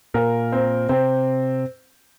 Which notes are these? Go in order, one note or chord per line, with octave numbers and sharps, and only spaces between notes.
A#2 A#4
C4
C3 C4